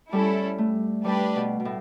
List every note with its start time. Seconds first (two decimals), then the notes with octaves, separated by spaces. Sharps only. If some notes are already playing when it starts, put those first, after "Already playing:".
0.12 G3 A3 C#4 E4 A4
0.58 A3
1.04 G3 D4 G4 B4
1.36 B2
1.60 B2
1.65 A2